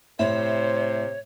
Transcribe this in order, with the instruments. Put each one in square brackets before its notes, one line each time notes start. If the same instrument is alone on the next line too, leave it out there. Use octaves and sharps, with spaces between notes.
[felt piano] A2 [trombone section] C3 C5 [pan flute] C#5 [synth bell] E5